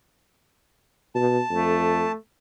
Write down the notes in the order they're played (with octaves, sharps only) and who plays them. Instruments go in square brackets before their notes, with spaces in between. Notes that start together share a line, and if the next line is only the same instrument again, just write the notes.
[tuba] B2 [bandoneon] A5
[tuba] F2 [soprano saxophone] A3